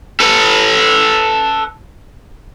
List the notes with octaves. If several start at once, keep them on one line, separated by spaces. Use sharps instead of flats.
A4 B4